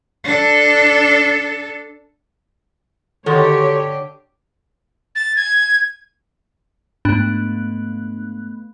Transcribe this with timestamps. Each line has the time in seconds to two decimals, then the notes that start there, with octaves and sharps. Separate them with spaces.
0.24 D4 A4
3.26 D3 D#3 D#4 F#4 G4 A4 C#5 C6
5.15 A6
5.36 G#6
7.05 G#2 A3 B3 D4 B5 F#6